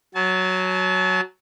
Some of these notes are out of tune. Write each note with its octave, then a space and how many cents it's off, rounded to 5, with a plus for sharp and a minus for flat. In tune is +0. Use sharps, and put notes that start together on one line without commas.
F#3 +0 A5 -40